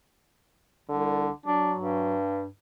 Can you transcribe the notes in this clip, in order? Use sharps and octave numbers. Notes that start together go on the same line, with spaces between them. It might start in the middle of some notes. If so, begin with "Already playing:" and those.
C2 D3
F#3 D4
G2